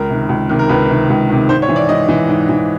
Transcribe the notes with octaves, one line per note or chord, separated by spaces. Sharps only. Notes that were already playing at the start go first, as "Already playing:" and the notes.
Already playing: C#2 A#4
C3 D#3
C#2
C3 D#3
A#4
C#2 B4
C3 D#3
C#2
C3 D#3
G#2 C5
C#5
E3
D5
G#2 D#5
E3
G#2
E3